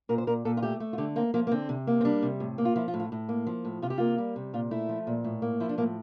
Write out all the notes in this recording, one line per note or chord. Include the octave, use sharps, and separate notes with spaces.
A#2 A#4
C5
A#2 A#4
A#2 A4
F4
A3 G4
A3
F4
D3 G4
A#3 C4
F3 A#3
A#3
D3 C4
C3
A#3
C4
G3 D4
C3
A2
A#3
F4
F3 E4
F4
A2
F4
A2
A#3
F3
A2
C3 F4
G4
A#3 F4
G3
C3
A#2 F4
A3 E4
F3
A#2
A2
A#3
F3 E4
D4
A2 A#3